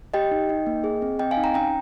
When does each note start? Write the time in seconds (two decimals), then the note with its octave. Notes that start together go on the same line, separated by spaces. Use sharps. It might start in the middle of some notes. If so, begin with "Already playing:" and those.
0.14 G4 D#5 G5
0.31 D#4
0.49 D#4
0.67 A#3
0.84 G#4
1.02 C4
1.19 C4 D#5 G5
1.31 F5 G#5
1.37 D#4
1.44 G5 A#5
1.54 C#4 G5 A#5